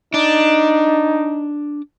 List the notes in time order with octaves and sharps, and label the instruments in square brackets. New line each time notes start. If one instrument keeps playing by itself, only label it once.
[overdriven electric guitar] D4 [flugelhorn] D#4